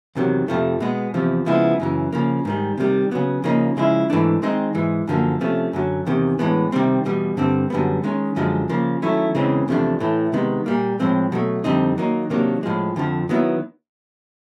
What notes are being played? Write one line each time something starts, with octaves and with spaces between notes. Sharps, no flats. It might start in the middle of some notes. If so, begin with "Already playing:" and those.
E2 C3 D#3 F#3
F2 C3 F3 A3
B2 G#3 B3
E2 C3 F3
C#3 F3 G#3 B3 E4
F#2 C#3 E3
C#3 F3 A#3
G#2 D#3 G3
C3 D#3 G3
C#3 F#3 B3
C#3 F3 A#3 D#4
C#3 F3 G#3 C#4 E4
G#2 E3 A3 D4
D#3 G#3 C4 D#4
G#2 E3 G#3
F#2 D3 F3 A#3
C3 F3 A3 C#4
F#2 D3 F#3
E2 C3 D#3
A2 E3 G#3 B3 D4
C3 D#3 G3 C4
E2 B2 G3
G2 D3 G3 C4
F#2 D3 G3 B3
D#3 G#3 C#4
F#2 D3 F3 G#3
C#3 F3 A#3
D#3 F#3 A3 C#4 E4
E2 C#3 E3 G#3 C4
E2 C3 F3 A3 D4
A2 E3 A3
C3 D#3 G#3 B3 D#4
A#2 G3 A#3
A2 F3 G#3 C4
B2 F#3 A3
F2 D3 G3 C4 D#4
D#3 F#3 A#3 D#4
C3 D#3 F#3 A#3 D4
A2 F3 G#3
F2 D3 F3
D#3 F#3 B3 E4